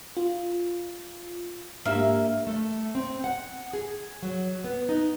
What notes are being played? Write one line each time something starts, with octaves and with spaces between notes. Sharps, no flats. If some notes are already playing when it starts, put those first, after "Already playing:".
F4
G#2 A#3 D4 G4 E5
A3
C4
F#5
G#4
F#3
B3
D#4